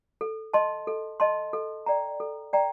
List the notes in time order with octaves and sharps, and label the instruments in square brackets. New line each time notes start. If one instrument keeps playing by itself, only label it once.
[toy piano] A4
D#5 A5 C6
A4
D#5 A5 C6
A4
D5 G5 A#5
A4
D5 G5 A#5